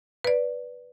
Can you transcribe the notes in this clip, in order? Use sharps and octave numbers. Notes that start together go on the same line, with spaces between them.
B4 D5